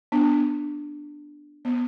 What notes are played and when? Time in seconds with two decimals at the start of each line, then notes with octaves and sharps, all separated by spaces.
0.12 B3 D4
1.65 B3